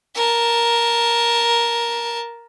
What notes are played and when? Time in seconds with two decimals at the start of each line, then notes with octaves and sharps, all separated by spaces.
0.15 A#4 A5